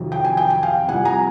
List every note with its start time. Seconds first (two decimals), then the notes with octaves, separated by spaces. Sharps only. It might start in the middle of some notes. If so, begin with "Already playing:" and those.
Already playing: F2 C3 D#3 F#3
0.12 G5
0.25 G#5
0.37 G5
0.50 G#5
0.63 F5 G5
0.89 C2 C3 F3 F#5 G#5
1.05 G#5 A#5